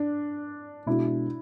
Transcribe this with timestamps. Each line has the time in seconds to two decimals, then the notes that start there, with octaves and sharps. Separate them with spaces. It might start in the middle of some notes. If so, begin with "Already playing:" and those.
Already playing: D4
0.86 B2 G#3 D4 E4 F#4